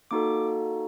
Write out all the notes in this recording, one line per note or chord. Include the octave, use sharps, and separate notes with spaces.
A#3 D#4 F#4 A4 D6